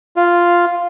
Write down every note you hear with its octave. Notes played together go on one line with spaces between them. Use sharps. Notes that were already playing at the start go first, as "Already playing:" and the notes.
F4